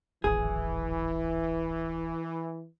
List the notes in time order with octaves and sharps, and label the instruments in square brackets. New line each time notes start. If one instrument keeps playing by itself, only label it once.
[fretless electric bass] D1 G#1 [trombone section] E3 [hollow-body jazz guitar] G#4